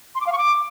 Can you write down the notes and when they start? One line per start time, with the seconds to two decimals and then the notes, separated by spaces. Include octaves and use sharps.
0.15 C6
0.21 D6
0.27 F5
0.32 C#6
0.38 D6